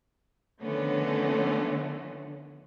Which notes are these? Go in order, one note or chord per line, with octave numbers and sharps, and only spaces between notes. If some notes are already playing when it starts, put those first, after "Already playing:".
D3 D#3 F3 A3 B3 C#4